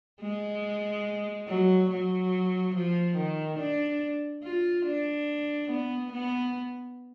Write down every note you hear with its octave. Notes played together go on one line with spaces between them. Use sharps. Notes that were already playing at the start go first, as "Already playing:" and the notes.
G#3
F#3
F#3
F3
D#3
D4
F4
D4
B3
B3